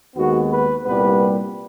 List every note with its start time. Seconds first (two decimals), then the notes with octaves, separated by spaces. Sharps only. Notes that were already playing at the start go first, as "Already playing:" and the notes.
0.16 D#2 D#3 G#3 B3 F#4
0.50 B4
0.85 C2 A#2 G3 B3 B4